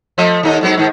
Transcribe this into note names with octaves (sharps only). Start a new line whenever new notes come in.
F3 A3 D#5
D#2 D#4 D#5
G#2 F#3 B3
G#2 D#3